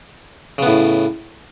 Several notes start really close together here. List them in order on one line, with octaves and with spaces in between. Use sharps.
C#3 B3 A2